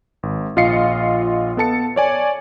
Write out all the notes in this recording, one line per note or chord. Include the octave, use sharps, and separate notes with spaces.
G#1
A#1 F4 D#5 F5 C7 C#7
B3 A4 A5 C#7
C#5 D5 G#5